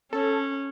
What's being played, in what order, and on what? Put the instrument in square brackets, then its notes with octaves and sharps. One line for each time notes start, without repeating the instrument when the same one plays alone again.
[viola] C#4 [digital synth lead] A4